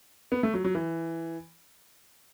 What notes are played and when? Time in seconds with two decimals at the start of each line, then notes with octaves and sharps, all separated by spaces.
0.32 B3
0.43 A3
0.54 F#3
0.64 F#3
0.75 E3